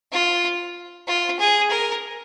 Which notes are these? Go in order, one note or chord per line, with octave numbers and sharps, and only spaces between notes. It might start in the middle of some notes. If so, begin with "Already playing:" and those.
F4
F4
G#4
A#4